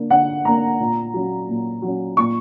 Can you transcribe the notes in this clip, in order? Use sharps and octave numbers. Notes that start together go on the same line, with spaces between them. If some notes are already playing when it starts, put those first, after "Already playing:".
Already playing: D3 A#3 D4
D3 F#5
A#3 D4 A#5
A#2
F#3 C#4
A#2
F#3 C#4
A#2 C#6